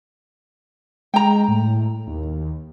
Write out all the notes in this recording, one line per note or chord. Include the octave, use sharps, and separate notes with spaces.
G#3 G5 A#5
A2
D#2